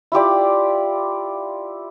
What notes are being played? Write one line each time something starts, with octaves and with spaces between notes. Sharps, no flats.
E4 F4 G4 D5